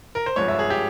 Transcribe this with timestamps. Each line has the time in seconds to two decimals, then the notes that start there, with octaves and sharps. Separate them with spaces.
0.15 A#4
0.26 C5
0.36 G#1 G2 F3 G#3 C#5
0.48 E5
0.59 G#4
0.70 G4